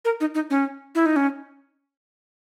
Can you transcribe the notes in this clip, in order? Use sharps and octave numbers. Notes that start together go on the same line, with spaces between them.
A#4
D#4
D#4
C#4
E4
D#4
C#4